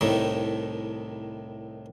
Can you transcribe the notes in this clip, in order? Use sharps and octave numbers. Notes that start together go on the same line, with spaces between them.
C2 A2 D#3 A3